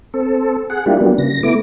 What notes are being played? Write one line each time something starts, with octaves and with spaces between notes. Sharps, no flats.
C4 A4
G#4 F#5
G3 A#3 D4 E4 F4 G4
F#3 G3 A#3 B3 D4
C#3 A#6
A3 B3 E4 D6